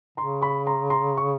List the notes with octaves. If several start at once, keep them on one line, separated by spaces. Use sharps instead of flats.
C#3 A#5 C6
B5 C#6
A#5 C6
A#5 C6
C#6